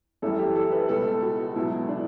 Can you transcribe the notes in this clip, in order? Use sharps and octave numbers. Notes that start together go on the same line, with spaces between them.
F#2 E3 G3 A4
G4
A4
B4
C#2 B2 G3 A4
F#4
C#2 B2 F#3 E4
D4